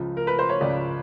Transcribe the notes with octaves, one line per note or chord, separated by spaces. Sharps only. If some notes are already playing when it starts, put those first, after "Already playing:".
Already playing: C#2 C#3 F3
A#4
B4
C5
C#5
C#2 C#3 F3 D5